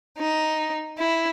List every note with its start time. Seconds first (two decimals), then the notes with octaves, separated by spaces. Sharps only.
0.17 D#4
0.98 E4